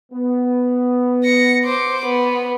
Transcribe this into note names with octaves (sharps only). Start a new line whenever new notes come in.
B3
A#6 C#7
C5 D6
B3